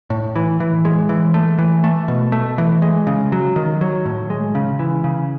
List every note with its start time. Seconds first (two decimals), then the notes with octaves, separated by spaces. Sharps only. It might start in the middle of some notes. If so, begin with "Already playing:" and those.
0.10 A2
0.36 E3
0.60 E3
0.85 G#3
1.09 E3
1.34 A3
1.58 E3
1.84 A3
2.08 B2
2.32 A3
2.58 E3
2.82 G#3
3.07 C#3
3.32 F#3
3.56 D#3
3.81 F#3
4.05 A2
4.30 G#3
4.55 C#3
4.79 E3
5.04 C#3